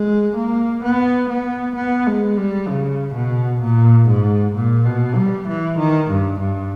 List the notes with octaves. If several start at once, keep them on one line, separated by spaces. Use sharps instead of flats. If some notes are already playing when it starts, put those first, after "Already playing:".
Already playing: G#3
A#3
B3
B3
B3
G#3
G3
C#3
B2
A#2
G#2
A#2
B2
G3
E3
D#3
G2
G2